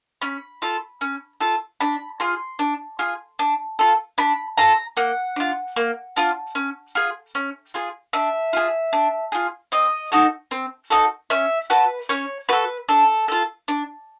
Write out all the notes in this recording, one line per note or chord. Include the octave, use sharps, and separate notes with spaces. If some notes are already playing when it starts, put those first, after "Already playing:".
C#4 B5
F4 A4
C#4
F4 A4
D4 B5
F4 G#4 C6
D4
F4 G#4
D4
F4 A4
D4 B5
F4 A4 A#5
A#3 F#5
D4 F4
A#3
D4 F4
C#4
F4 G#4
C#4
F4 G#4
D4 E5
F4 G#4
D4
F4 G#4
C4 D#5
D#4 F#4 A4
C4
D#4 F#4 A4
C#4 E5
F#4 A4 B4
C#4 C#5
F#4 A4 B4
D4 A4
F4 A4
D4